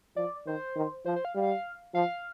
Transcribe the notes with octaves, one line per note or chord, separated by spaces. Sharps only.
F3 D5
D#3 C5
D#3
F3 C5
C5
F5
G3
F3 F5